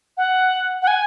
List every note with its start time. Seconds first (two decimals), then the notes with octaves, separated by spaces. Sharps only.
0.17 F#5
0.82 F#5
0.87 G#5